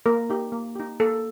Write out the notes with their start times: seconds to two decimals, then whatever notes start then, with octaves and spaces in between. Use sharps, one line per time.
0.06 A#3 A#4
0.30 D#4 G4
0.52 A#3
0.75 D#4 G4
1.00 A#3 A4